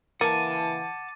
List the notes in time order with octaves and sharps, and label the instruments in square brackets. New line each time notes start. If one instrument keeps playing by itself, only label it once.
[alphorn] E3 [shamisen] A#3 [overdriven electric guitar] F#5 A5 [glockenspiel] D6 A6 D#7